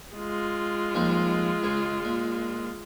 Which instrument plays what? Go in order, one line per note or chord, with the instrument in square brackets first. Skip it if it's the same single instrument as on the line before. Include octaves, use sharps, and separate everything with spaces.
[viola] G#3 F4
[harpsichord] D#2 F3 G3
C#2 G#4
A#2